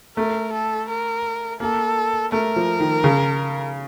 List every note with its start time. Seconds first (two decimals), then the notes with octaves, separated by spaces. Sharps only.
0.17 A3 A#4
0.53 A4
0.88 A#4
1.60 A#3 A4
2.32 A3 A#4
2.56 F3
2.80 D#3
3.04 C#3